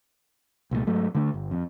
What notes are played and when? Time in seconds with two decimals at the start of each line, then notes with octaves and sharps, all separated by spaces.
0.71 C2 A#2 E3 A3
0.87 G#2 F#3 A3
1.15 D3 A3 D4
1.34 G1
1.51 F2